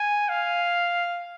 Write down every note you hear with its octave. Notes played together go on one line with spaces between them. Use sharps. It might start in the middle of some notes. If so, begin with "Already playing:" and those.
Already playing: G#5
F5